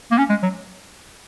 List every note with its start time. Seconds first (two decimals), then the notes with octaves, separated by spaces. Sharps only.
0.11 A#3
0.18 C#4
0.29 G#3
0.43 F#3